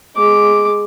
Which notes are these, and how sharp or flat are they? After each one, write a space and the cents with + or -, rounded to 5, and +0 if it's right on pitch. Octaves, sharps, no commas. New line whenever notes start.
G#3 +0 D6 +0